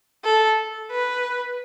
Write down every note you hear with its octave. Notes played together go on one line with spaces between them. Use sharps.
A4
B4